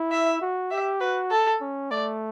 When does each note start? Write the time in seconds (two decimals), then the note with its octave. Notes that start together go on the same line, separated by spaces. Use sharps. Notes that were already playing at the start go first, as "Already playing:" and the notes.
Already playing: E4
0.11 E5
0.41 F#4
0.71 G4 E5
1.00 F#4 B4
1.31 A4
1.61 C#4
1.91 A3 D5